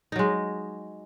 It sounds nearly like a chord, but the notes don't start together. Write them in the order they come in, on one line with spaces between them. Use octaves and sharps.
D#4 F#3 G#3